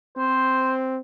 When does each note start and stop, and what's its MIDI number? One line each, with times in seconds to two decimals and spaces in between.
0.17 0.99 60
0.17 0.75 72